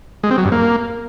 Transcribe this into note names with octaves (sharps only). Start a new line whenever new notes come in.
G#3
C4
F#3
G2
A#3